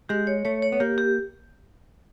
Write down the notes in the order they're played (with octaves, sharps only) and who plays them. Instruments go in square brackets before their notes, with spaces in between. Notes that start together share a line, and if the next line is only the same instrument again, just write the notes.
[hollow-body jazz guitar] G#3 [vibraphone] G4
[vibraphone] C#5
[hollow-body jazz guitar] A3 [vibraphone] C#5
[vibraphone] C#5
[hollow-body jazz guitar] B3
[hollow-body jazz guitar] A#3 [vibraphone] G4
[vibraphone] G4